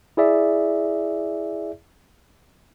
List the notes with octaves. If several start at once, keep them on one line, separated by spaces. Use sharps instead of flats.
E4 G#4 D5 E5